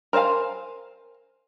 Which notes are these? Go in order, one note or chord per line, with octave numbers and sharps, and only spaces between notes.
A#4 C5 D#5 F5 G#5